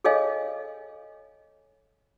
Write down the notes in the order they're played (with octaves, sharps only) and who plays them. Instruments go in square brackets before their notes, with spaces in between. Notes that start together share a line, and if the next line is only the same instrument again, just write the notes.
[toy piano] G#4 A4 C#5 D#5 F5 G#5